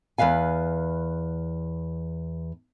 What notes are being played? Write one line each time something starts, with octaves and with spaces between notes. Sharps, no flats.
E2 G#2 B4 F5 G#5